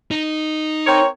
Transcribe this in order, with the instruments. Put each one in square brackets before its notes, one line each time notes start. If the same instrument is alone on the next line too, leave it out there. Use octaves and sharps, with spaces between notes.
[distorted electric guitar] D#4
[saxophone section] C4 A#4 C#5